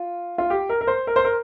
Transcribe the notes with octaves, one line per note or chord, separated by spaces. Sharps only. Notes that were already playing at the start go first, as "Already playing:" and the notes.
Already playing: F4
F4
G4
A#4
A#4
C5
A#4
C5
A#4